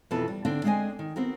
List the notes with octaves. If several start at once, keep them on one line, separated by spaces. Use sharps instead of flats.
F2 B2 E3 A4 B4 A5
G3
D3 C4 D4
G#3 C4 D4 D#5 G#5
D#3
B3 C4 F#4 A#4